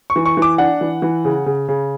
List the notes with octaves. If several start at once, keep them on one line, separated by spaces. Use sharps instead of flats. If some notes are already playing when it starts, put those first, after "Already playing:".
C#6
E3
C#6
E3 D6
D4 F#5
E3
E3
C#3
C#3
C#3